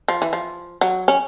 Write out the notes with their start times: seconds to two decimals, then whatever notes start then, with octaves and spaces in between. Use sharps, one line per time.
0.08 F3
0.22 E3
0.33 F3
0.81 F#3
1.08 C#4